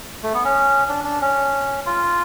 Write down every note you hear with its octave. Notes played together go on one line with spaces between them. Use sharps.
A3
B3
C#4
D4
D4
C#4
F4